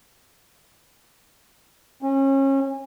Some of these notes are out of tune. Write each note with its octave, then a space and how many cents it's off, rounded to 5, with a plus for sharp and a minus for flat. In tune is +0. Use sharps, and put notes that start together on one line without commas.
C#4 -30